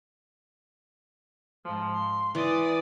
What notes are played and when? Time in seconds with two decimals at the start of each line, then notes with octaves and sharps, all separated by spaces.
1.64 G#2 F3
1.94 C6
2.35 E3 D5 D#6